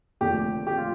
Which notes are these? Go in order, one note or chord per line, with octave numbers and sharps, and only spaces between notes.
F1 D#2 D3 F3 A3 G4
G4
F4